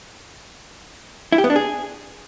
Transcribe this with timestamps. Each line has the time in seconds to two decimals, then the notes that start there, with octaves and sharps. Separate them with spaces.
1.32 E4
1.38 G4
1.44 B3
1.50 D4
1.56 G#4